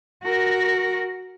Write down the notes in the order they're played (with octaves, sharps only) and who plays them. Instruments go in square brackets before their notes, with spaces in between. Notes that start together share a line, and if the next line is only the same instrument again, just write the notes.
[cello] F#4 A#4